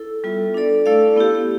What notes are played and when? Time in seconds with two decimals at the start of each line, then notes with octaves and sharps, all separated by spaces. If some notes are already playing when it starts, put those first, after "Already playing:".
Already playing: E4 A4
0.24 G3 B3 F4 A4 E5
0.54 D4 A4 D5
0.86 A3 E4 A4 D5 F5
1.16 B3 E4 G4